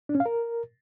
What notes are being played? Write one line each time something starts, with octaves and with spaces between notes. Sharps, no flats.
D4
C#4
F5
A#4